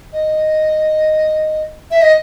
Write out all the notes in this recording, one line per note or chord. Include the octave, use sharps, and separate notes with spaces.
D#5
E5
D#5